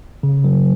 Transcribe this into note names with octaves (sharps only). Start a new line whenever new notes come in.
C#3
F#3